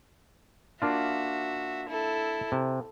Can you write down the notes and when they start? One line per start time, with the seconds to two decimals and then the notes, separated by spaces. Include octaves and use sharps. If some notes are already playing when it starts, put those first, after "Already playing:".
0.82 A#3 D4 F4 F#4 E5
1.89 E4 A4
2.52 C3